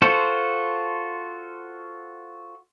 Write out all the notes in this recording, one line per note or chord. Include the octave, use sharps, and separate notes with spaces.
F4 F#4 A4 C5